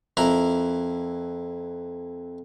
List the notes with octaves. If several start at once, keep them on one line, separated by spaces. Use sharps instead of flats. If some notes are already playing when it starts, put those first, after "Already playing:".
F2 E4 A#4 A#5 B5